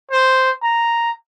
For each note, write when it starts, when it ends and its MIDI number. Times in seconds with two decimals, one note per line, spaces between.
0.11 0.51 72
0.63 1.11 82